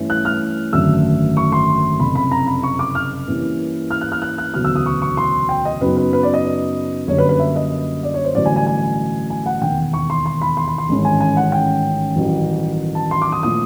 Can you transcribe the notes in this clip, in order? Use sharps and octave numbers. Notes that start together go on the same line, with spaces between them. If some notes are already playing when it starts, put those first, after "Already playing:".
Already playing: G2 E3 A3 C#4
F#6
F6
G#1 F#2 D3 F#3 A3 E6
C#6
C6
F#1 F2 C3 B5
B5
A#5
B5
C#6
D6
F6
G2 E3 G3 A#3 C#4
F6
F#6
F6
F#6
F#6
E1 D2 C#3 F#3 B3 F6
E6
D#6
C#6
C#6
C6
G5
D#5
F#2 C#3 F#3 B3 D#4 B4
B4
B4
D5
D#5
F#2 D3 G3 A#3 D4 C#5
B4
B4
E5
D#5
D5
C#5
C5
A1 G2 D3 F#3 A3 D5
G#5
G#5
G#5
G#5
F#5
E1 D#2 D#3 G5
C#6
C6
C6
B5
C6
B5
C6
A1 G#2 D#3 G#3 C#4
G#5
G#5
F#5
G5
A1 G2 D#3 F#3
A5
C6
D6
D#6
A#2 F3 A3 D#6